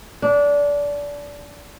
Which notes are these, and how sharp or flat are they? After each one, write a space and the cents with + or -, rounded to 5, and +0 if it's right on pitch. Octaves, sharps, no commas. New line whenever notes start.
D4 -20